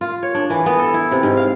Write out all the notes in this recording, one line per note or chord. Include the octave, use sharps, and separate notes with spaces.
F4
C#5
D4
E3
B3
A4
E4
C3
G#2
F5